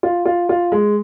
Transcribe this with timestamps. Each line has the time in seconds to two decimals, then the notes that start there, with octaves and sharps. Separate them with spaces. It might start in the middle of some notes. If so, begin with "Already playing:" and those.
0.03 F4
0.25 F4
0.49 F4
0.72 G#3